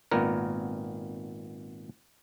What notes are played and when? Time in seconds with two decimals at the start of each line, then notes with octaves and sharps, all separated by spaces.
0.11 G#1 A#2 B3 A#4